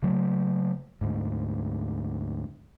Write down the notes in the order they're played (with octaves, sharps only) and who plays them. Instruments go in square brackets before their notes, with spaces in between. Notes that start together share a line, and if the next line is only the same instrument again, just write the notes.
[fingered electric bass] C#3 F#3 A3
D2 G#2